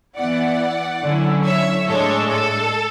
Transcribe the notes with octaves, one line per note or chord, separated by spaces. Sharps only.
E3 B3 E4 D5 F#5
D3 F#3 C#4 E4
C#5 E5
A2 G#3 D4 A4 C#5
A4